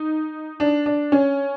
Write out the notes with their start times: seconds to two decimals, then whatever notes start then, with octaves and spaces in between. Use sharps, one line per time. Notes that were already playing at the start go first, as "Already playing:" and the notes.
Already playing: D#4
0.60 D4
0.86 D4
1.12 C#4